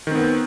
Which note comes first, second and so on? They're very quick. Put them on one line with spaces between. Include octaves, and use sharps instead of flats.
D#3 C4 B3